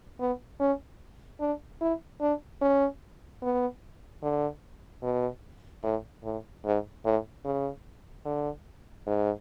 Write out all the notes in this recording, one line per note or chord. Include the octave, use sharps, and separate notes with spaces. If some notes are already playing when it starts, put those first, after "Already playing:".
B3
C#4
D4
E4
D4
C#4
B3
D3
B2
A2
A2
G#2
A2
C#3
D3
G#2